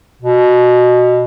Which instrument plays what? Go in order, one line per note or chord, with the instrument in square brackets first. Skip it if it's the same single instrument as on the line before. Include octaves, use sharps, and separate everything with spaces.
[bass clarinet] B2